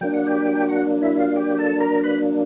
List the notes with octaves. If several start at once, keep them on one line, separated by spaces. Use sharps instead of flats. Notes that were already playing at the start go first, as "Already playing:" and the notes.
F#3 A#3 D4 G5
F#5
G4 G5
F#4 F#5
E4 E5
F4 F5
G4 G5
A4 A5
A#4 A#5
B4 B5